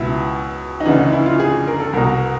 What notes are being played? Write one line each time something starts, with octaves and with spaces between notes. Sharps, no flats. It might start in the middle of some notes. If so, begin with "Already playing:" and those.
Already playing: C#2 B2 E4
D#4
D2 C#3 E3 D4
D#4
E4
F4
G#4
A#4
A4
C2 B2 A#4